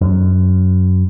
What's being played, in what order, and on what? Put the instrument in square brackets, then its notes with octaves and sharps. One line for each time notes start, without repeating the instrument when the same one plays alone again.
[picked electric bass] F#2